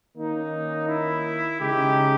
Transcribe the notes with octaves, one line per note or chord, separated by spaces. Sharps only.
D#3 A#3 C#4 D#4
E4
C#3 G#3 D#4 G4